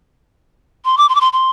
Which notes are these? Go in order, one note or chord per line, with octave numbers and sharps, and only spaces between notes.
C6
D6
C6
D6
C6
C6